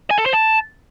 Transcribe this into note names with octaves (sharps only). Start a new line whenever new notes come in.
G#5
A4
C5
A5